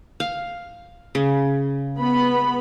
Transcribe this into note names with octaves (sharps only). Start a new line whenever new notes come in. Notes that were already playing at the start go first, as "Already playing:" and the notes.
F5
C#3
B3 B5